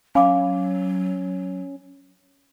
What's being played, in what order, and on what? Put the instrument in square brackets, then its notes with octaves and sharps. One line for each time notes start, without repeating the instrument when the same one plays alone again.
[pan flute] F#3 [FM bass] C#4 [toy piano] F5 B5 D6